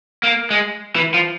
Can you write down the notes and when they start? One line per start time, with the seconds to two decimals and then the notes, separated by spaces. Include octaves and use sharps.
0.23 A#3
0.51 G#3
0.96 E3
1.14 F3